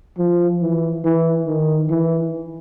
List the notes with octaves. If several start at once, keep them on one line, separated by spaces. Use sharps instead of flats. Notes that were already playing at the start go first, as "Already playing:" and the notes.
F3
E3
E3
D#3
E3